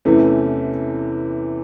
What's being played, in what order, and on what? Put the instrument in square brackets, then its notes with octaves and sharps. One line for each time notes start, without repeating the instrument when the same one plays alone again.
[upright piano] E2 C3 E3 A3 C#4